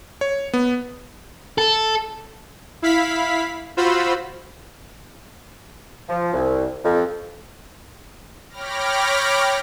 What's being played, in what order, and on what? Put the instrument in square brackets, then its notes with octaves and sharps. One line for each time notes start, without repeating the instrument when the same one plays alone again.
[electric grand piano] C#5
B3
[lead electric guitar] A4
[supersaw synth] E4 F5 B5 B6
F4 F#4 C5 B5 E6
[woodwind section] F3
C2
F2
[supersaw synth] C#5 G5 B5 D6 F6 A#6